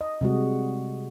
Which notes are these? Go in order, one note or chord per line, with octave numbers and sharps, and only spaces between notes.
D#5
C3 G3 G#3 F#4